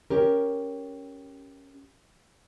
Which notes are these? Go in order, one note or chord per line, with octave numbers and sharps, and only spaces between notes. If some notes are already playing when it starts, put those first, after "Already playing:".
C#4 G4 A#4